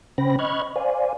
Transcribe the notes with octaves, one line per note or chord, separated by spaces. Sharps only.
C#3 C#4 C5 G5 B5 A#6
D#5 B5 C#6 F6 F#6 G#6
C5 D5 F5 G#5